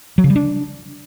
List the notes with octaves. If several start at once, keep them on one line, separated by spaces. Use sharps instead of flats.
F#3
C#3
G3
D4